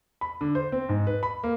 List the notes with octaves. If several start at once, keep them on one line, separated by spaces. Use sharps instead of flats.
B5
D3
C5
C4
G#2
B4
B5
A#3